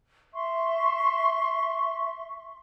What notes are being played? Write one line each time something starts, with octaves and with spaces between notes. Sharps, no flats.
E5 C6 C#6